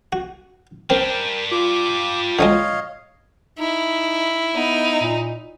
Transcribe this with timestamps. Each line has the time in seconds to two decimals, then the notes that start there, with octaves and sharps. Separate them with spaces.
0.12 F#4
0.90 G3 C4 D4 A#4 G5
1.51 F4 D6
2.39 D3 F#3 G#3 C#5 D#5 F5
3.59 D#4 E4
4.56 B3 D#4
5.01 A#2